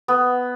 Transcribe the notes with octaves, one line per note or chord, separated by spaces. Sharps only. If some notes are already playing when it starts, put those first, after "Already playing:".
B3